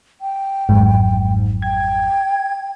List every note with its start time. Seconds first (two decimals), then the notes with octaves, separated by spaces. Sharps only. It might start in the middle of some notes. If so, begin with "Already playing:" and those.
0.21 G5
0.69 G#1 F2 G#2 F#3
1.62 G5 G#6